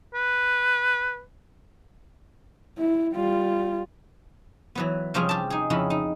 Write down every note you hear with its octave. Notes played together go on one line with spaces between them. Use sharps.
B4
E4
G3 F4
E3 F#3 B3
C3 F3 G3 C#4 F4 G#4
G4 A5
D#4 G#4
F2 C#3 D#4 E4 B5
D#4